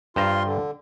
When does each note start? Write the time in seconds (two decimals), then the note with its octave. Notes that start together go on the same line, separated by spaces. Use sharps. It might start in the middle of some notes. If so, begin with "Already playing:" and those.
0.16 G2 F4 C5 A#5 C6
0.45 D3